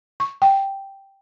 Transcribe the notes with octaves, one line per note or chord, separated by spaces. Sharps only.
C#6
G5